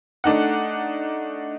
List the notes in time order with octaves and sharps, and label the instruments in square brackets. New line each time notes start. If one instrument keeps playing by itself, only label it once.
[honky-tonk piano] A3 D4 D#4 F#5